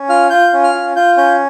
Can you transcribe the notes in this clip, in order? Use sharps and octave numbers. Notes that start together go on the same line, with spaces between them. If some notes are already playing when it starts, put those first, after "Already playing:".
Already playing: C#4
F4 F6
F4 G6
C#4
F6
F4
F4 G6
C#4 G6